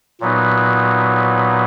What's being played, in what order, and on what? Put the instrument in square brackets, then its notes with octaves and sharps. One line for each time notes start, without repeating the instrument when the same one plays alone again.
[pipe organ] A#2 F#3 B3 D#4